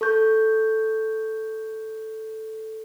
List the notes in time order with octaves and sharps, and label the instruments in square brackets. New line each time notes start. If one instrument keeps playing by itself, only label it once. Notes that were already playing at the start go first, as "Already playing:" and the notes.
[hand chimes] A4 C#6 G6